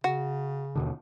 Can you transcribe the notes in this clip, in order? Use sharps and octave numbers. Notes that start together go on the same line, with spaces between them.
C#3 F#4
D#2 B2 D3